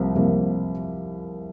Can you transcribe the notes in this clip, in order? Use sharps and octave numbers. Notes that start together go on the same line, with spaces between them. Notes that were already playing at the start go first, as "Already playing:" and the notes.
Already playing: C2 C3 F3 A#3
C2 C3 F3 A#3